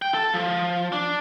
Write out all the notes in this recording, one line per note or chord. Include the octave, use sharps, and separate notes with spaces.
G5
A4
F3
D4